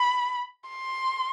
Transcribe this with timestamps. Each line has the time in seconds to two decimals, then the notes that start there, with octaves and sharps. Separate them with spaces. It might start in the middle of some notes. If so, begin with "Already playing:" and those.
Already playing: B5
0.69 C6